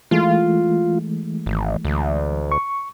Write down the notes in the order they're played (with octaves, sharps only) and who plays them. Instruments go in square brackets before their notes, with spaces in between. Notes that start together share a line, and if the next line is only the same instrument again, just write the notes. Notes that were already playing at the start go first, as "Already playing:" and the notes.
[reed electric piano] E3 G#3 A3 [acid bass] F4
[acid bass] G#1
D2
[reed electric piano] C#6